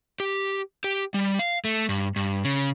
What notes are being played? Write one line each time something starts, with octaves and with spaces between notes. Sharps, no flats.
G4
G4
G3
F5
A3
G2
G2
C#3